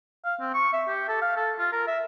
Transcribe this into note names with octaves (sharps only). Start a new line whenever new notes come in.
F5
C4
C#6
E5
G4
A4
F5
A4
F4
A#4
E5